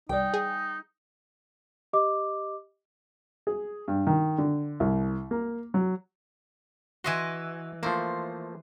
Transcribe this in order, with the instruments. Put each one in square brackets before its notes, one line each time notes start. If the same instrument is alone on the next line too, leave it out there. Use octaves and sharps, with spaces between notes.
[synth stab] C2 [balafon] G3 D5 [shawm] D#4 [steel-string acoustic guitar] G5
[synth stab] G#4
[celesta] G4 D#5 D6
[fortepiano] G#4
G2
D#3
D3
C2
A#3
F#3
[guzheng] E3 D#5 C6 [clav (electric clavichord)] F#4 E5 G#5
[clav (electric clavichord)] F3 A3 A#3 [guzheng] C5